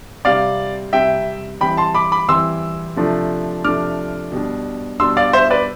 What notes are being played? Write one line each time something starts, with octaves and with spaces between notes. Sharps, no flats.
C3 G3 C4 D5 F5
C3 G3 C4 E5 G5
E3 G3 C4 G5 B5
A5 C6
B5 D6
B5 D6
E3 G3 C4 C6 E6
C3 F3 A3 D4
C3 F3 A3 D4 D6 F6
B2 G3 D4
B2 G3 D4 C6 E6
D5 F5
C5 E5
B4 D5